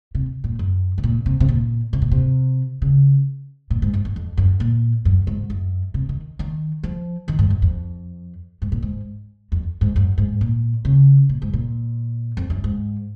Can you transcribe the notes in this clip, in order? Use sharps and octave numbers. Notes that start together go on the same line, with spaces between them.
C3
A#2
F#2
C3
A#2
C3
C3
A#2
C3
A#2
C3
C#3
A#2
G#2
F#2
F#2
F2
F#2
A#2
F#2
G#2
F#2
C3
D#3
D#3
F3
D#3
G#2
F#2
F2
G#2
A#2
G#2
F2
G#2
F#2
G#2
A#2
C#3
A#2
G#2
A#2
F2
F#2
G#2